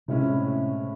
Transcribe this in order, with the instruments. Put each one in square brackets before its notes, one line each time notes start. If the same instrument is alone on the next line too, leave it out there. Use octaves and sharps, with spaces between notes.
[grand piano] A2 G#3 C#4 E4 [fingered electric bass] C3